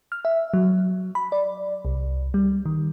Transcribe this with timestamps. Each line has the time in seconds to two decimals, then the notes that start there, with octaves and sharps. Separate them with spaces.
0.12 F6
0.25 E5
0.54 F#3
1.15 B5
1.32 D5
1.85 C2
2.34 G3
2.66 D#3